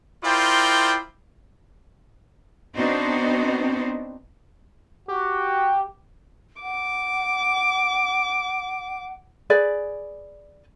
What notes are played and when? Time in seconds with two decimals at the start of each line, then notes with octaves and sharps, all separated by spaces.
0.24 E4 F4 A#4 C5 D5 G5
2.76 B3 C4 D4 D#4 F#4 C5
5.08 F#4 G4
6.62 F#5 D6
9.50 G#4 B4 D5